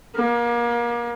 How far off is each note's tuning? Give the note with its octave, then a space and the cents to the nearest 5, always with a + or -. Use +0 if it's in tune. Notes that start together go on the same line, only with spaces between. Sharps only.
A#3 +35